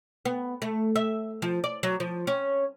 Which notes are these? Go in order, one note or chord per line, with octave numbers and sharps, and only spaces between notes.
B3
A3
E5
F3
D5
F#3
F3
C#4